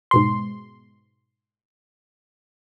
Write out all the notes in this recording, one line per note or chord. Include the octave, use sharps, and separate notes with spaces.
G#2 B2 C6